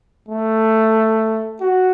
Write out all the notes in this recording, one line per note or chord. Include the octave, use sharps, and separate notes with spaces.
A3
F#4